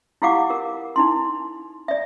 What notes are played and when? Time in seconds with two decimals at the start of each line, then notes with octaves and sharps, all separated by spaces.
0.22 E4 F4 G4 F5 F#5 D6
0.50 A#4
0.96 D#4 E4 C6
1.88 D5 E5